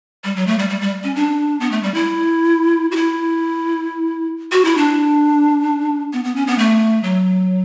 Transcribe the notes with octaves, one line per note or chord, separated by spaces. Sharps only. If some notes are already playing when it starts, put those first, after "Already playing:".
G3
F#3
A3
G3
G3
G3
C#4
D4
B3
A3
G3
E4
F#4
E4
F#4
E4
D4
B3
B3
C#4
B3
A3
F#3